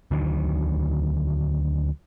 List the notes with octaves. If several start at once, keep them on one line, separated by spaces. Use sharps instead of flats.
D2 D3 D#3 F#3